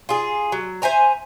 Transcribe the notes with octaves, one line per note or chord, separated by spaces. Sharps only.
F4 G#4
F#3
C5 E5 G#5 A#5